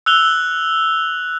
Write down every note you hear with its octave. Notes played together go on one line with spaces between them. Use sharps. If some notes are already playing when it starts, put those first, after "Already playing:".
E6 F#6 F7 G7